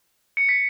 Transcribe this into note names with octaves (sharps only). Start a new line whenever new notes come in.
C#7
B6